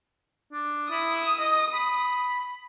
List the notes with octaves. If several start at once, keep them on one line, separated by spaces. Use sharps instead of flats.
D4
E4 D#6
D#5
B5